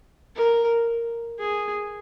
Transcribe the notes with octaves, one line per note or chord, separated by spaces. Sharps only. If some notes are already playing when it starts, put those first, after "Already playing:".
A#4
G#4